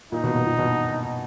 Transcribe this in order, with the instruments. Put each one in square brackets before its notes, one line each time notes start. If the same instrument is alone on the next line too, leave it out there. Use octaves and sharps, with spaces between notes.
[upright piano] A#2 [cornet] D#4
[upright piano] B2
B2
A#2
B2